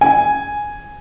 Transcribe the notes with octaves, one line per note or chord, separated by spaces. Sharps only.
G#5